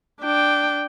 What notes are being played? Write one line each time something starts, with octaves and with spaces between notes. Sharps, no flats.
D4 G5